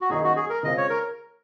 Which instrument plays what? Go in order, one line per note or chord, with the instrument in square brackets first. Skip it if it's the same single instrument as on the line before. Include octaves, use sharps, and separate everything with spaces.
[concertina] F#4
[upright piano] F#2 D#3 A#3 D#4 [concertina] G#4
[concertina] F#4
G#4
A#4
[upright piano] C#3 G#3 C4 F4 [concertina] D#5
[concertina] C#5
A#4